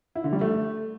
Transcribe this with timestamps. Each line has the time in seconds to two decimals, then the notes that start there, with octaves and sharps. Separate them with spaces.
0.15 E4
0.24 D3
0.33 G3
0.41 A3